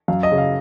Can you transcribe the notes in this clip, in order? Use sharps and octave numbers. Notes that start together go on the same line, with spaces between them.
F#2 F5
D#5
C#3
F5